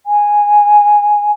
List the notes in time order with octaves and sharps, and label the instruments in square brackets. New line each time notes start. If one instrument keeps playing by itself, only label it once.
[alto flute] G#5